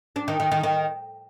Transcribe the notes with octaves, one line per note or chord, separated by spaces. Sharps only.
D4
D#3
D#3
D#3
D#3